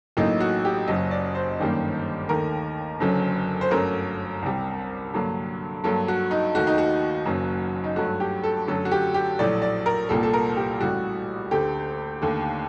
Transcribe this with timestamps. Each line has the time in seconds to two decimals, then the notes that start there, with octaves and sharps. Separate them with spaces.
0.17 A1 A2 F#3 A#3 D#4
0.40 F#4
0.65 G4
0.87 F#1 F#2 F#3 D#5
1.11 D5
1.35 C5
1.59 G1 F#2 D#3 G3 A#3
2.29 D#2 D#3 A3 A#4
3.00 F#1 F#2 D3 F#3
3.61 C5
3.71 G1 F#2 F#3 A3 A#4
4.42 C2 C3 G3
5.14 G2 D3 F#3 A#3
5.84 G2 F#3 A#3 A4
6.08 F#4
6.31 D#4
6.55 D#2 D#3 A3 F#4
6.67 D#4
6.78 F#4
7.25 F#1 F#2 F#3 A#3
7.84 D#4
7.96 G2 F#3 A3 F#4
8.20 G4
8.44 A4
8.67 F#2 D3 F#3 A3 A4
8.85 F#4
8.92 G4
9.14 G4
9.39 A#1 A2 F#3 A3 D5
9.62 D5
9.86 A#4
10.09 C2 A#2 G3 A#3 A4
10.23 A4
10.33 A#4
10.57 G4
10.81 A1 A2 G3 F#4
11.51 D2 D3 A3 G4
12.22 D#2 D3 A3